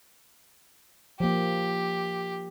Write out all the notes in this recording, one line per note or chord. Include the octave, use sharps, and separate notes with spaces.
F3 A#3 G4